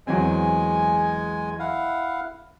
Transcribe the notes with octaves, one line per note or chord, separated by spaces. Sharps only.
E2 F#3 G#3 C4 G#5
E4 F5 F#5